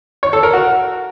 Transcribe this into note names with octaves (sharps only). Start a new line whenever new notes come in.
C#5
A4
A#4
F#4